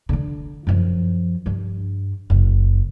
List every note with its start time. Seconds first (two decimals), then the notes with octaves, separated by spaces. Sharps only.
0.09 D3 D4
0.67 F#2 F3
1.46 G2 D4
2.30 F#1